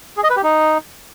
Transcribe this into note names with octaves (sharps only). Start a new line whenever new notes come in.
G#4
D#5
B4
G4
D#4